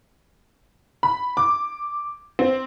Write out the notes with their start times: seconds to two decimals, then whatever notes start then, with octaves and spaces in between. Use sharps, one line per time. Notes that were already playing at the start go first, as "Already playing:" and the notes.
1.03 B5
1.37 D6
2.39 C4